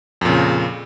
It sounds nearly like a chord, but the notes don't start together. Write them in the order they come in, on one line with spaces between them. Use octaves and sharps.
F2 A#2 C#3